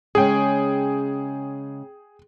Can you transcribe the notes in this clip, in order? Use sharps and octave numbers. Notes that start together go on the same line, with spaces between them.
C#3 G#3 C#4 G#4 G5